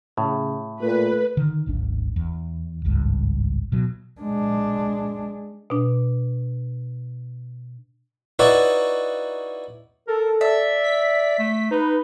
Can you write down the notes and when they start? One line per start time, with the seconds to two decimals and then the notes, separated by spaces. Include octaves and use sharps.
0.18 A2 C#3
0.82 A#2 A3 B4
1.37 D3 D#3
1.66 D1 G#1 C#4 D4
2.16 E2
2.85 G#1 C#2 G2
3.72 B2 F#3
4.21 G#3 D4
5.70 B2 D4
8.39 D#4 E4 F#4 B4 C#5 D5
10.07 A4 A#4
10.41 D5 E5
10.83 B6
11.39 A3
11.71 D#4 B4